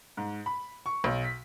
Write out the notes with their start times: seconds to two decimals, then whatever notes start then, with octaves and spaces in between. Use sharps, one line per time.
0.17 G#2
0.46 B5
0.86 C#6
1.04 B1
1.24 B6